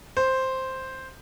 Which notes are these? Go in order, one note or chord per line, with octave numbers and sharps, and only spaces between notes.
C5